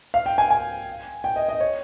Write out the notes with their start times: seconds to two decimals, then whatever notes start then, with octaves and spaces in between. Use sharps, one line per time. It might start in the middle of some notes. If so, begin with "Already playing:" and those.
0.14 F5
0.26 G5
0.38 G#5
0.50 G#5
1.24 G5
1.36 D#5
1.49 D#5
1.60 C#5